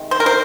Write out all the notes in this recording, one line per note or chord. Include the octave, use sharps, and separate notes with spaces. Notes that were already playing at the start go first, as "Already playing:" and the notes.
Already playing: C3 D#3 G#3
C5
A#4
C5